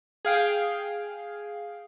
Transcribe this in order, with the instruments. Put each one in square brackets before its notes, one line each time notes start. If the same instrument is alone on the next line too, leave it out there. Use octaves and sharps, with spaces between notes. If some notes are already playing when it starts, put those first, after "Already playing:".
[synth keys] G#4 F5 G5